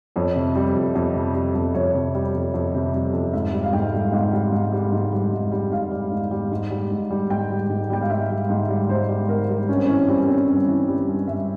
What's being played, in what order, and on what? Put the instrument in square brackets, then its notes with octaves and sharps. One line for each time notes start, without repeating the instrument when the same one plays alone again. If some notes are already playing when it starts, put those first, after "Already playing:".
[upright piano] F2 C#5
C3
G3
F2
F2
C3
G3
F2
F2 C#5
C3
G3
F2
F2
C3
G3
F2
G#2 E5
G3
F5
G#2 G5
G3
G#2 F5
G3
G#2
G3
G#2
G3
G#2
G3
G#2 F5
G3
G#2
G3
G#2
G3
G#2
G3
G#2 G5
G3
G#2
G3 G5
F5
G#2 E5
G3
G#2
G3
G#2 C5
G3
G#2 A#4
G3
G2 C#4
C4
E3 C#4
G3 C4
C#4
G2 C4
G2 C#4
E3
G3
G2
G2 E5